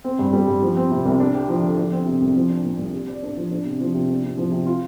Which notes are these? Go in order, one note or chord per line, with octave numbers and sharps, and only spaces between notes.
C4
G2
G3
G2
F3
C4
C3
C2
D4
G4
F3
D3
F3
C4
C3
C2
F3
D4
A#2
C2
G4
D5
D4
F3
D4
C3
F3
C3
D4
C3
F3
C3
F4